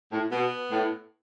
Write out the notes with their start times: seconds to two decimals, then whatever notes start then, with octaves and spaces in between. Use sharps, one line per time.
0.12 A2
0.31 B2 B3
0.71 A2